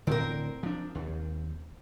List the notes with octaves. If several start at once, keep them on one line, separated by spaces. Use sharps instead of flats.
A2 D3 C4 A#4
F3 D4
D#2